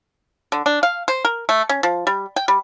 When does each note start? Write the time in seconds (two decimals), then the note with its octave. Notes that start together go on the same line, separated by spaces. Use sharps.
0.52 D3
0.66 D4
0.83 F5
1.08 C5
1.25 A#4
1.49 A3
1.69 C#4
1.83 F3
2.07 G3
2.36 G5
2.48 G3